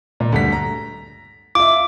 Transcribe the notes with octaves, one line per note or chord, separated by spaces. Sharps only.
A#2
D2 G2 B6
A#5
F4 E5 D6